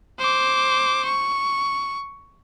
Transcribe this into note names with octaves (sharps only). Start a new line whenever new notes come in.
C5 D6
C#6